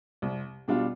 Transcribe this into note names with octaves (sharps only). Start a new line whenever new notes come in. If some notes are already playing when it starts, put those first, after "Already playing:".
C2
B2 G3 D4 F4